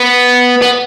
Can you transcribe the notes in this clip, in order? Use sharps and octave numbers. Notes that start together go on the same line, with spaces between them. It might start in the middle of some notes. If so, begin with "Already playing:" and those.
Already playing: B3
B3